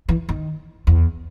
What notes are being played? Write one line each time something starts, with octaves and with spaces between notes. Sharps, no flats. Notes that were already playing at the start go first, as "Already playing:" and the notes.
E3
D#3
E2